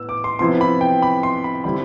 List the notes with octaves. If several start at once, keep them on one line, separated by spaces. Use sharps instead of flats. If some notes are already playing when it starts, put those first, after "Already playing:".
Already playing: A2 B3 E6
D6
C6
C3 F3 B3 E4 C6
B5
G5
B5
C6
B5
D3 G3 C4 E4 B5